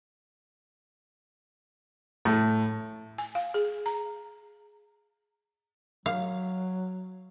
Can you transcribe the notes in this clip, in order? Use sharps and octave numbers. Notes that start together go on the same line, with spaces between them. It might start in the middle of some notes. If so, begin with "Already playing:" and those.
A2
G#5
F5
G#4
A#5
F#3 F5